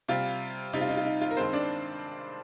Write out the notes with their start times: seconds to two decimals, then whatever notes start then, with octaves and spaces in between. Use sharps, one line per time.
0.08 C3 G3 F4
0.73 C3 G3 D#4
0.81 F4
0.89 D#4
0.97 F4
1.05 D#4
1.21 F4
1.31 A#4
1.37 G2 D#3 G#3 C4 C5
1.53 D4 D5